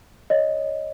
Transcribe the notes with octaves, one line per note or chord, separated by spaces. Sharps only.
C#5 D#5